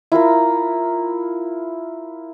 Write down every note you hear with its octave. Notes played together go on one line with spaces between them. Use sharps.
E4 F4 A#4 A#5